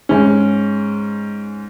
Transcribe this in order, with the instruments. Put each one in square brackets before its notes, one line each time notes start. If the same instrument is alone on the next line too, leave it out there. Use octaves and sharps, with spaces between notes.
[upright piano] G#2 G#3 C#4